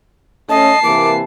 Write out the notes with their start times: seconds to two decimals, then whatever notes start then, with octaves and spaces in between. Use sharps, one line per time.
0.49 A3 C#4 D#5 A5 C7
0.84 C3 E3 A#3 D6